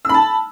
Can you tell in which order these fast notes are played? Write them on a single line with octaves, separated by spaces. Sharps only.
E6 B5 A5